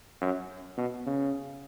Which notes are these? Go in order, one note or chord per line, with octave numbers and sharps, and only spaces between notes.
F#2
B2
C#3